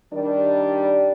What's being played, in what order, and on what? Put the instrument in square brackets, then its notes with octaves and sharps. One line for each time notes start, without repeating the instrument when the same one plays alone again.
[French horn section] D#3 G3 D4